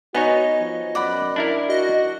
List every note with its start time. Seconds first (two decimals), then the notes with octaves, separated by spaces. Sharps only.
0.15 B3 D#4 F#4 C#5 D#5 G#5
0.60 F3
0.95 F#2 D5 F#5 B5
1.36 D4 E4 A#4
1.70 F#4 D#5